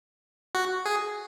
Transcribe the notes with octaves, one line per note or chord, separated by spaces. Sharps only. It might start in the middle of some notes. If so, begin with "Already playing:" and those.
F#4
G#4